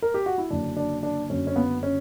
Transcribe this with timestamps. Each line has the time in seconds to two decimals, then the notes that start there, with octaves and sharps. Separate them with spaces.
0.02 A#4
0.14 G4
0.26 F#4
0.38 E4
0.50 F#1 F#2 D3 D4
0.76 D4
1.03 D4
1.30 F#1 F#2 D3 C#4
1.47 C#4
1.56 B3
1.83 C#4